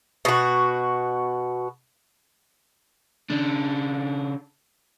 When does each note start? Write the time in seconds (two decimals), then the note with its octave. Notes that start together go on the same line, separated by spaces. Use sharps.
0.25 B2 F#4
3.30 C#3 D4